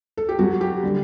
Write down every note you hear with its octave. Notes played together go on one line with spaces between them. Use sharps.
A4
G4
F#2 F#3 F#4
G4
D3 G3